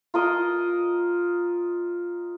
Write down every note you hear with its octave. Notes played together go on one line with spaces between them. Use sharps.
F4 A#4 D#5